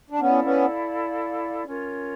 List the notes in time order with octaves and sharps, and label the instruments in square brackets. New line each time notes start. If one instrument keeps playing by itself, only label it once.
[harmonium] D4
[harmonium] B3 C#4 [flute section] E4 A4 D5 F5
[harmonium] B3 C#4
[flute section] C#4 F4 A#4 C#5